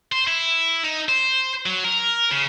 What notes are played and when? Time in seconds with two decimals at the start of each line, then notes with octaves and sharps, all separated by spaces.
0.12 C5
0.27 E4
0.84 D#4
1.09 C5
1.66 F#3
1.85 A#4
2.31 C#3